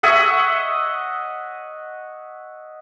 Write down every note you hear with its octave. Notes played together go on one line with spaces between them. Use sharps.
C#5 D#5 E5 F#5